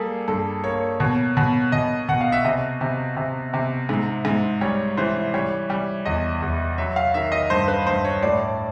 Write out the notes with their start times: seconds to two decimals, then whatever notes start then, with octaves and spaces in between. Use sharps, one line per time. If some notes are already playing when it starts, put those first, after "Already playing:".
Already playing: G3 A#3 G#4 A4
0.28 G2 A4
0.64 A#3 C#5
1.00 B2 C#5
1.37 B2
1.72 B2 D#5
2.08 B2 F#5
2.21 F5
2.32 E5
2.45 C3 D#5
2.81 C3
3.17 C3
3.54 C3
3.89 G#2
4.25 G#2
4.61 G3 C#5
4.97 E3 C5
5.34 G3 C#5
5.70 G3
6.05 E2 D#5
6.42 E2
6.78 F#3 E5
6.96 F5
7.14 D#3 E5
7.32 D#5
7.50 G2 C5
7.68 B4
7.86 G2 C5
8.05 C#5
8.23 A2 D5